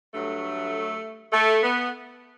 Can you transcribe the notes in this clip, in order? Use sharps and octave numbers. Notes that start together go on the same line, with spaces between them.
G2 F#3 A3
A3
B3